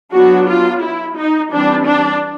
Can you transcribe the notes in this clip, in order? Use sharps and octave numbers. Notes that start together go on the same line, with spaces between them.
F#3 B3 D4 F#4
F4
E4
D#4
E3 G3 C4 D4
D4